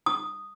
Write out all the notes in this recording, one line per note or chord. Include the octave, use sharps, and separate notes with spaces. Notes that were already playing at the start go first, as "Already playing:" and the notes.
D#6